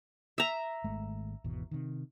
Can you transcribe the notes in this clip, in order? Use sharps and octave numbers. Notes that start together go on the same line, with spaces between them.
E5 A#5
G#1 G#3 A3
G#1 E2 B2
C3 D#3